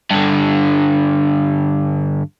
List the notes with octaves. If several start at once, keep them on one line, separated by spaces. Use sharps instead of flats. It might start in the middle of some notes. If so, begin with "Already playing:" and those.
G2 D3